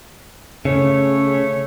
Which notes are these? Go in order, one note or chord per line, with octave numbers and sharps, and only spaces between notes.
C#3 A3 C#4 C#5